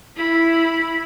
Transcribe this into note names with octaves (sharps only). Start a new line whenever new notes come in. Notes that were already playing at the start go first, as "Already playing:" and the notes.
E4 B5